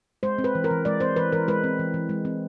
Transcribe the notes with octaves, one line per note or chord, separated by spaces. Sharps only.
G#3 C5
C4
B4
E3
A#4
E3
G#3 D5
C4 C5
E3 B4
E3 A#4
G#3 B4
C4
E3
E3
G#3
C4